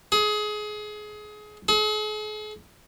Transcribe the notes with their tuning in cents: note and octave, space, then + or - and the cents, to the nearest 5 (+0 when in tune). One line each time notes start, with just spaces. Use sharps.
G#4 +25
G#4 +45